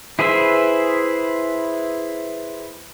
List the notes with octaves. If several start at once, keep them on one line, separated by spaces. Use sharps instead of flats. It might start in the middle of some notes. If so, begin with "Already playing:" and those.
E4 G#4 B4 C5 E5